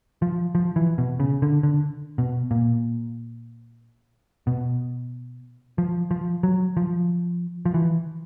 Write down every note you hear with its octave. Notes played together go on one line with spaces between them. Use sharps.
F3
F3
E3
B2
C#3
D3
D3
B2
A#2
B2
F3
F3
F#3
F3
F3
E3